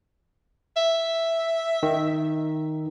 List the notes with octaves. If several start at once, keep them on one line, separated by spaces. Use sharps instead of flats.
E5
D#3